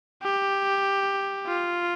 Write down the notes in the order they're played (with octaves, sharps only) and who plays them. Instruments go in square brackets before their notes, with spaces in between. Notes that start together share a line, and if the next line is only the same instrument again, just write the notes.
[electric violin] G4
F4